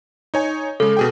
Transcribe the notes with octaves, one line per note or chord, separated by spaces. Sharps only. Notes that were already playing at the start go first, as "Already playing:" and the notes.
D#4 C#5 G#5
C#3 G#3 A4
B2 G#4 G5